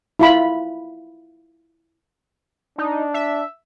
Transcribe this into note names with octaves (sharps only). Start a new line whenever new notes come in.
E4 F4 B5
D4 D#4
E5